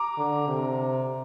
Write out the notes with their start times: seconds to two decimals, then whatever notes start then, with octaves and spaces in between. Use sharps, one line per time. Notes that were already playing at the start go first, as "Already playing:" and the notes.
Already playing: A#5 D6
0.17 D3
0.48 C3